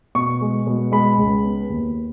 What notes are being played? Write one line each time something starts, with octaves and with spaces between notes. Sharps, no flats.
B2 C#6
G#3
B2
G#3 B5
C#2
B3
D#2